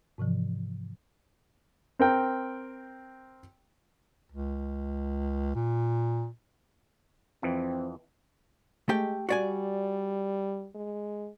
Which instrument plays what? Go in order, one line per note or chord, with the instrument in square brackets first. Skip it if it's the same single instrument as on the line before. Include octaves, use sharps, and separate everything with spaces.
[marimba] G#2 C3 E3 F3
[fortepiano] C4 A#4 G5
[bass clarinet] C#2
A#2
[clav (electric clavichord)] F2 E3 [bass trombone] C4
[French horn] G#3 [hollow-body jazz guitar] A3 G4 G5
[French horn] G3 [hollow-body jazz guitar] F#4 D5 G#5
[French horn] G#3